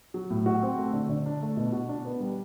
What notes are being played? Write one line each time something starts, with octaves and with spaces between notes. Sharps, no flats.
F#3
A2
F#4
C4
A3
D3
D3
D4
A3
B2
F#4
D4
B3
G3